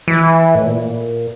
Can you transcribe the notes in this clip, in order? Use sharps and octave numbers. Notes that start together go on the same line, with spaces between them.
E3
A2
A#2